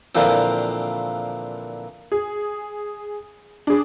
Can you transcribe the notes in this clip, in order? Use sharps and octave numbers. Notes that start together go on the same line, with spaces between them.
A#2 D3 E3 F3 C4
G#4
D4 G#4